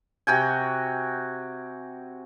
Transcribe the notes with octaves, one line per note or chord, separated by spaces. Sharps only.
C3 F#4 G5 G#5